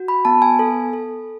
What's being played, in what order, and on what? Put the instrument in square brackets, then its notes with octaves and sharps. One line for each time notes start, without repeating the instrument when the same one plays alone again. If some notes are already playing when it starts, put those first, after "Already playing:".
Already playing: [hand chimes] F#4
B5
B3 A5
G#5
A4
A4